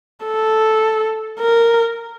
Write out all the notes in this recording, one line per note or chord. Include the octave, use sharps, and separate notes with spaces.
A4
A#4